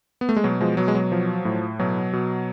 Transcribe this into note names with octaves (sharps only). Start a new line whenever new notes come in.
B3
A3
G#3
B2 F#3
F3 G#3
B2 F#3
G#3
F#3
F3
A2
B2 F#3
B2